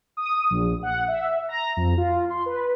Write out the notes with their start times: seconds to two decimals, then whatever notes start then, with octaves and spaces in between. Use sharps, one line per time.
0.17 D#6
0.50 A#1
0.83 F#5
1.08 E5
1.49 A#5
1.77 F2
1.97 F4
2.30 C6
2.46 B4